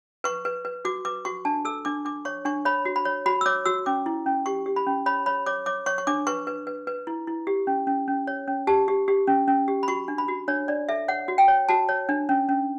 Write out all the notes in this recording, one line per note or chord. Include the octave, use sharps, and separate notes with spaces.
B4 C#6
B4
B4
F#4 D6
B4 D6
F#4 C#6
D4 A5
A4 E6
D4 D6
D4 D6
C#5 C#6
D4 C#6
C#5 B5
F#4
B5
C#5
F#4 B5
E6
C#5 D6
F#4 E6
C#4 D6
E4
C#4
G4 C#6
G4
B5
C#4
C#5 B5
C#5 B5
C#5 D6
C#5 D6
C#5 C#6
C#6
D4 D6
B4 C#6
B4
B4
B4
E4
E4
G4
C#4
C#4
C#4
C#5
C#4
G4 A5
G4
G4
C#4
C#4
G4
B5
F#4 C#6
D4
B5
F#4
D4 C#5
D4 D5
A4 E5
C#5 F#5
F#4
G5
C#5
F#4 A5
C#5
D4
C#4
C#4